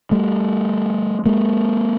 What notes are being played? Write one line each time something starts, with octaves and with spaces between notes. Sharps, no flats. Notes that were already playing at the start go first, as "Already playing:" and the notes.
G3 A3
G#3 A#3